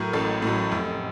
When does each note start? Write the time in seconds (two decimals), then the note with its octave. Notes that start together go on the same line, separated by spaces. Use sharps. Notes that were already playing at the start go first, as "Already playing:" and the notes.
Already playing: A2 F#3 A#4
0.13 A1 A4
0.42 A2 F#3
0.72 F1